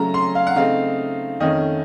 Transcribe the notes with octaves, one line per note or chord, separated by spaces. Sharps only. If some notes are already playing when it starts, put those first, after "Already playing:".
Already playing: C#3 F#3 A3 C#4 A#5
C6
F5
F#5
C#3 A3 C4 D#4 F5
F2 D#3 A3 C#4 D#5